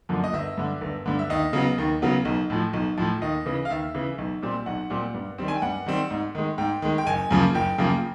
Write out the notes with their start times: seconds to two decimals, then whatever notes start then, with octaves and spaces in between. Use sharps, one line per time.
0.09 F#2 D3 F3 A#3
0.24 D#5
0.33 G1 E5
0.57 G2 D3
0.81 G1
1.06 G2 D3
1.19 E5
1.30 D#2 D#5
1.53 C#3 F#3 B3
1.78 D#2
2.02 C#3 F#3 B3
2.25 B1
2.50 A2 F3
2.73 B1
2.98 A2 F3
3.21 D#2 D#5
3.46 C#3 E3
3.65 F5
3.70 D#2 E5
3.94 C#3 E3
4.18 B1
4.42 A#2 G3 C4
4.66 B1 F#5
4.90 A#2 G3 C4
5.14 G2
5.38 D#3 G3 C4
5.48 G#5
5.55 G5
5.62 G2 F#5
5.86 D#3 G3 C4
6.11 G#2
6.35 D#3 G#3
6.58 G#2 G5
6.82 D#3 G#3
6.98 G5
7.07 F#1 G#5
7.31 F#2 C#3 F3 A#3
7.55 F#1 G5
7.78 F#2 C#3 F3 A#3